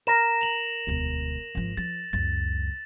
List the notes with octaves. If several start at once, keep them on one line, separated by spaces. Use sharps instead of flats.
A#4 A#6 E7
F7 F#7
E1 D2
G#1 F3
F3 A6
C#2 F#2 A6